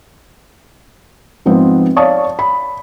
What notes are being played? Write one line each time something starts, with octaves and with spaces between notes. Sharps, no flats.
G#2 F3 B3 C4
C#5 D5 F5 A5 C#6 D#6
B5